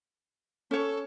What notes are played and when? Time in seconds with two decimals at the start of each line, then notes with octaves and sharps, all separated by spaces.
0.71 C#4 A4 C#5